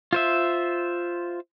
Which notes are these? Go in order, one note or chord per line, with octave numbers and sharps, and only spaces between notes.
F4 C5 E5